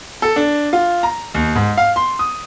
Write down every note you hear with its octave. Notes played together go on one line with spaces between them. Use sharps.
A4
D4
F4
A#5
D#2
G#2
F5
C6
D#6